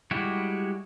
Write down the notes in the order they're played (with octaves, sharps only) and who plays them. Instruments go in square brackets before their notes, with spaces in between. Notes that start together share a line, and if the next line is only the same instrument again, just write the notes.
[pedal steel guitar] G3 G#3 E4 F#4 G4